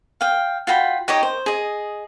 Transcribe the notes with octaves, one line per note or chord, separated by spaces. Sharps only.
F5 G5
F4 F#4 G5 B5
D#4 G4 C#5 D#5
C5
G#4 D#5